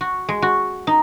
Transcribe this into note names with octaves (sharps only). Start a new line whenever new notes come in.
F#4
G#3
F#4
D#4